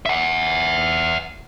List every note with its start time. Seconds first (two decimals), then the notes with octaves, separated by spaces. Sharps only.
0.06 E5 F#5